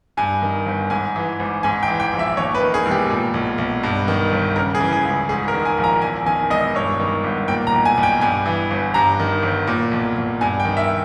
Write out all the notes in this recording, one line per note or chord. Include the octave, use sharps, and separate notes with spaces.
G2 G#5
D#3
G1
G#2 G#5
E3
G#1
G#2 G#5
G5
E3
G5
A#1
E5
D#2 C#5
B4
D#3
G#4
E1
G4
A#2
B1
B1
G2
D#3
G1
C#3 A#4
G#4
E3
G#4
C#2
G#2 G#4
A#4
D#3
G#5
A#1
A#5
E2 G#5
D#3 G#5
E1 D#5
G2 C#5
D#3
G1
A#2 G5
A#5
B1
G#5
B1
G5
G2 G#5
E3
G1
G2 A#5
D#3
G1
A#2
B1
B1
G2 G#5
G5
D#3
E5